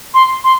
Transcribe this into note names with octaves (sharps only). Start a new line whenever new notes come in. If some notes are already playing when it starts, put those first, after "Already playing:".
C6
C6